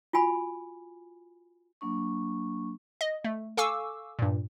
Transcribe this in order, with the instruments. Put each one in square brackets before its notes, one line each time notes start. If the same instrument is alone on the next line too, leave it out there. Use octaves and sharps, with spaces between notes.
[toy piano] F4 F#4 G#5 B5
[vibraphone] F#3 A#3 D4 C#6
[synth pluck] D#5
A3
A4 F5 G#5 C#6 D6 E6
G2 A#2